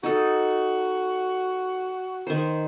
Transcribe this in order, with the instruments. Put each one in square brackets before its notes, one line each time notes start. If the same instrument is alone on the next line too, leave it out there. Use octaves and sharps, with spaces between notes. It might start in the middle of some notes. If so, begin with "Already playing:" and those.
[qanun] D#4 A4 [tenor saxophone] F#4
[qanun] D#3 C5